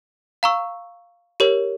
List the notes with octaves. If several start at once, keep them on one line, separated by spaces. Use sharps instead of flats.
F5 A#5 C#6 E6
G4 A#4 C#5